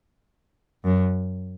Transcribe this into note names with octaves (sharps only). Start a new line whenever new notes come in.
F#2